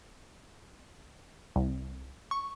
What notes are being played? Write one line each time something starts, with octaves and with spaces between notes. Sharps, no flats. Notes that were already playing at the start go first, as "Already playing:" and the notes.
C2
C#6